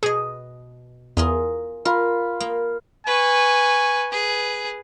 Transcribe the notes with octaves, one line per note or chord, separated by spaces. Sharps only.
B2 G#4 D#5
E2 F4 G#4 A#4
F4 A#4 B5
A#3
B4 G#5 C#6
G#4 B4